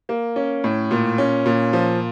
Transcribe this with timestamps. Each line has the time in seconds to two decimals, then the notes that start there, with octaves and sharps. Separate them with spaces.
0.09 A#3
0.36 C#4
0.64 A2
0.91 A#2
1.18 C#4
1.46 A#2
1.73 F3